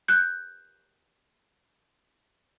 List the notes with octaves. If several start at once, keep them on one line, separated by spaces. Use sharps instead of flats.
F#6 G6